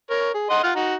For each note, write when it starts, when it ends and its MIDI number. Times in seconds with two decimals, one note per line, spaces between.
0.10 0.30 70
0.10 0.30 73
0.34 0.46 68
0.50 0.59 75
0.50 0.59 78
0.50 0.59 84
0.64 0.71 65
0.64 0.71 77
0.64 0.71 78
0.75 0.95 63
0.75 0.95 66